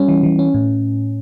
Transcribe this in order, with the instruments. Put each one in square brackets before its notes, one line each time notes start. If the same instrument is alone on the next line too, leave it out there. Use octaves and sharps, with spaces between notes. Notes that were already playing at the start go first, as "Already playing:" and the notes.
Already playing: [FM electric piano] G3 C#4
E3
E3
C#4
A2